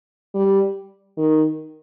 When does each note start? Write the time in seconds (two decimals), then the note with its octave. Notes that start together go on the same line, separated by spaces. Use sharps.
0.35 G3
1.18 D#3